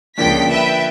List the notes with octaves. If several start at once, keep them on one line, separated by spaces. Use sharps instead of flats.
C#2 D3 F3 A#3 G5 B6
B4 E5 G5